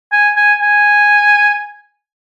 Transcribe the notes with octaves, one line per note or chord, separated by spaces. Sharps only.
G#5
G#5
G#5